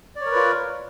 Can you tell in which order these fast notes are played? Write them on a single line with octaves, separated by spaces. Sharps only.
D5 C#5 A#4 B4 F4